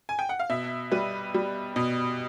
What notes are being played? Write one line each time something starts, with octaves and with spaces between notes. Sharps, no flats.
G#5
G5
F#5
F5
B2 E5
G3 B4
G3
B2